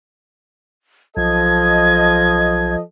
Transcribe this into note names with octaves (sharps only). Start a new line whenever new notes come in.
B1 F3 A4 D#5 G#6